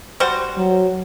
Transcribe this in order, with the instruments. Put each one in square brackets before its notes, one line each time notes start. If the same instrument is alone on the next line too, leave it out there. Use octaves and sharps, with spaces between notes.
[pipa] G3 F#4 C5
[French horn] F#3